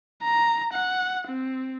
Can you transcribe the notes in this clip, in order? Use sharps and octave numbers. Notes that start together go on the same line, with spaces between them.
A#5
F#5
C4